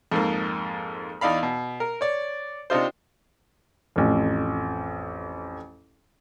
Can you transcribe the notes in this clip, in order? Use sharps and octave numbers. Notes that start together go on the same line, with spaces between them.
F2 G#2 A#3
E2 D#4 D5 F5 B5
B2
A#4
C#5 D5
C3 D4 D#4 F4 C5
A1 F2